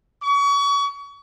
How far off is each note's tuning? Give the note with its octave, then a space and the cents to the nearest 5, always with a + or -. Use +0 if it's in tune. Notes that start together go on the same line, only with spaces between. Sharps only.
C#6 +35